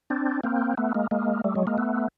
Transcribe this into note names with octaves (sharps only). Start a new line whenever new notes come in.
C4 D4
A#3 C4
A3 B3
G#3 A#3
G#3 A#3
G3 A3
F#3 G#3
G#3 A#3
A3 B3